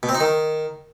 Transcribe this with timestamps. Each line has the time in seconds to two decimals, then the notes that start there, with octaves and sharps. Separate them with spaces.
0.03 B2
0.09 C4
0.15 D#4
0.20 D#3